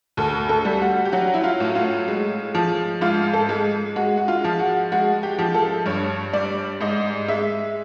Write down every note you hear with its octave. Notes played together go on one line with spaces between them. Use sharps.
D2 A4
A4
G3
F#4
G4
F#3 F#4
E4
F4
A2
F4
G#3
F3
G#2 F4
A4
G#3
G#3 F#4
F#4
F4
F3
F#4
G#3 F#4
G4
F3
A4
G2 C#5
G3 D5
G#2 D#5
G#3 E5